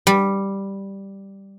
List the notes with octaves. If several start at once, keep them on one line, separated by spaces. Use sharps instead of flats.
G3